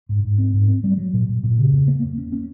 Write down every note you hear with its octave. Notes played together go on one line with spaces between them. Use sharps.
G#2
G#2
C4
G#2
C4
G3
F#3
A#2
A#2
A#2
C#3
E2
A#3
A#3
C#4
C#4